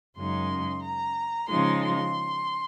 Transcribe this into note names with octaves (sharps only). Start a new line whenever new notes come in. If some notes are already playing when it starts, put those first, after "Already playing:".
F#2 C#3 G#3 D#4 C6
A#5
C#3 F3 G#3 D#4 C6
C6